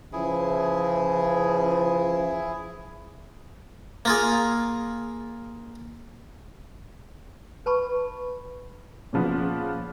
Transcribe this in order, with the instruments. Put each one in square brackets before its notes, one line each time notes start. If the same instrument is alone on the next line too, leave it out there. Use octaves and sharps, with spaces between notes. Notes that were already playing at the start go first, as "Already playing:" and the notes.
[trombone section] C#3 E3 F3 [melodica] E4 G#4
[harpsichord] A#3 F4 G#4
[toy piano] B4 A5 B5 C#6
[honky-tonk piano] A#2 C#3 F3 B3